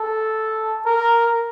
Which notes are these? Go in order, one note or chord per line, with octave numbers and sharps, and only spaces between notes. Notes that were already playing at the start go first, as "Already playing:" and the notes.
Already playing: A4
A#4